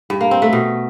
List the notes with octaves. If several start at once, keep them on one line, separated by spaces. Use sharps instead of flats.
G2
A#3
C4
A3
B2